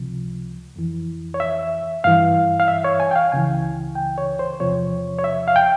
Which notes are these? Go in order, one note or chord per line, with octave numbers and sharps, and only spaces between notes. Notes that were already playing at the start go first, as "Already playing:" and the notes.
Already playing: C#2 C3 F3
F2 E3
C#5
E5
G2 E3 F5
F5
E5
C#5
G#5
G5
F5
C#2 C#3 E3 G#5
G5
C#5
C5
E2 C3 F3 C#5
C#5
E5
F5
G5